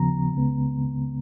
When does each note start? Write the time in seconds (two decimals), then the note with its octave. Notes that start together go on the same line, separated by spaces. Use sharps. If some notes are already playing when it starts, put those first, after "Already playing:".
Already playing: D#2 C#3 F3 B3 A#5
0.33 C#2 C#3 G#3 B3